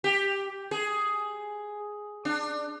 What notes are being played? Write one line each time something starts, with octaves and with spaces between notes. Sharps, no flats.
G4
G#4
D4